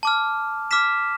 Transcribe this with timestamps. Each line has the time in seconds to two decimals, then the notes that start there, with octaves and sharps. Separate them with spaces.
0.03 A5 D6 F6
0.71 D6 F6 B6 E7